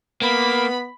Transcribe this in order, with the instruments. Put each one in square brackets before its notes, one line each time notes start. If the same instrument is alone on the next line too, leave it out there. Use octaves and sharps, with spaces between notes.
[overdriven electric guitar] A#3 [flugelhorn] B3 [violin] B5